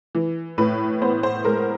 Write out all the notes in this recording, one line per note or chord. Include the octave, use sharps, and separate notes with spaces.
E3
A2 B4
B3 C5
C5
G#3 A#4